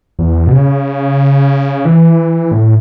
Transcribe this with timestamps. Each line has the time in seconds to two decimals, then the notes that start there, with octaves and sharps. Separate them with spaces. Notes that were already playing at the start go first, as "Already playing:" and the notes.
0.19 E2
0.47 B2
0.52 C#3
1.85 E3
2.52 A2